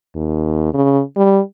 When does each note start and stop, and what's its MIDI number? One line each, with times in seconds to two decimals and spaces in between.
0.16 0.73 39
0.74 1.01 49
1.16 1.40 55